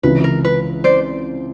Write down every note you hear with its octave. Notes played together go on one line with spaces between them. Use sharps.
C#2 C3 E3 B4
A#4
B4
C5 D5